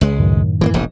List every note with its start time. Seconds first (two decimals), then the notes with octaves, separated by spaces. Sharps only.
0.01 C#2 G#3
0.20 F#2 A2 D#3
0.61 E3 G#3 A#3
0.74 E1 A#1 G#2